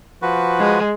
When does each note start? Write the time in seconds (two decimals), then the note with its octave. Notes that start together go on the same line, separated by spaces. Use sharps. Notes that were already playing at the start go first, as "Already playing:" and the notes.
0.22 F3 F#4 B4
0.59 G#3